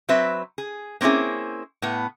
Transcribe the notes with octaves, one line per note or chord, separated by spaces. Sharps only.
F#3 C4 B4 E5
G#4
A#3 C4 C#4 E4 G#4
A2 B3